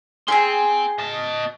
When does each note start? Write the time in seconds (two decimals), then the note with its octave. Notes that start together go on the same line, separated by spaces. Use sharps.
0.28 G#4 G5 G#5 C6
0.99 D#5 A5